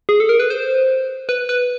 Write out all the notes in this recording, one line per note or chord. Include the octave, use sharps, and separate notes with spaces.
G#4
A4
A#4
B4
C5
B4
B4